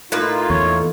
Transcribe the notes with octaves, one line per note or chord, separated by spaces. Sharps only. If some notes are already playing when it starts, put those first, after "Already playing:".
A2 A#3 D#4 F4 B4
E2 C#5